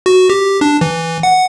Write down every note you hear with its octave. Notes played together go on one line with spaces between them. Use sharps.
F#4
G4
D4
E3
F#5